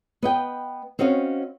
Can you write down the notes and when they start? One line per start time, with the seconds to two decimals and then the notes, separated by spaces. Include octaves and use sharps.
0.23 B3 D#5 G5
0.99 C4 C#4 F#4 D#5 F5